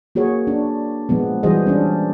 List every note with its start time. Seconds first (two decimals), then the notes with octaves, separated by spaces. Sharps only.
0.15 A#3 F#4 G#4 C#5
0.47 D4
1.09 A#2 F3 G#3 B3
1.43 E3 G3 F#4 G#4 C5 D#5
1.67 C#4 D4